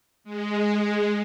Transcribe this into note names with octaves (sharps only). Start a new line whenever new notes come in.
G#3